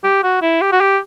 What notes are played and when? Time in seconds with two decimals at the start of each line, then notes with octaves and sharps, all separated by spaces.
0.04 G4
0.24 F#4
0.42 E4
0.61 G4
0.72 F#4
0.81 G4